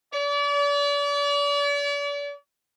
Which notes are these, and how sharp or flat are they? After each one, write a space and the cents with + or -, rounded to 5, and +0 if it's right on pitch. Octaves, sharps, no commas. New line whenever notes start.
D5 -40